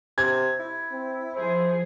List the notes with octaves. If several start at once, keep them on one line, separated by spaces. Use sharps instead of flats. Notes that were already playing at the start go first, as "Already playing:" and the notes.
C3 G#6
E4
C4
F3 G#4 C5